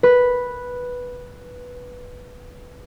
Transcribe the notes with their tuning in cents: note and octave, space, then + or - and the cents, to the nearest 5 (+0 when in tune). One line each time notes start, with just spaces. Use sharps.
B4 -5